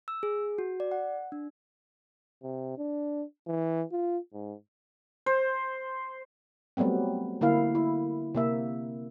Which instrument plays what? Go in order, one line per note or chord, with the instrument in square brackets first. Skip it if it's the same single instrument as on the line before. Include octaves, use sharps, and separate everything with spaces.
[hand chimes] E6
G#4
F#4
D5
F#5
D4
[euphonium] C3
D4
E3
F4
G#2
[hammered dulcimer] C5
[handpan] F#3 G3 A3 B3 C4
D3 A#3 E4 F5
E4
C3 A#3 E5